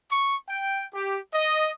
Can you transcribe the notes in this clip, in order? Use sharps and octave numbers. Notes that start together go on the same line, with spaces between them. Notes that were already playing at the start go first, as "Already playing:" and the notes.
C#6
G5
G4
D#5